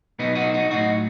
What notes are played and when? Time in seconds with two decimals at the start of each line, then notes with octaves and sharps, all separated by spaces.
0.19 B2 F#3 B3 D#4
0.35 D#4 F#4
0.54 D#4 F#4
0.71 A2 F#3 D#4 F#4